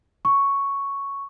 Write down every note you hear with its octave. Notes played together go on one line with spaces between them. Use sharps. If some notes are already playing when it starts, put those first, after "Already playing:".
C#6